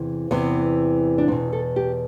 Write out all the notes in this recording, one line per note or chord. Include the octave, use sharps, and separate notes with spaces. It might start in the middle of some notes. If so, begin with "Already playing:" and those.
Already playing: E2 C3 E3
E2 C3 E3 B3
D4
E2 B2 C4
A4
G4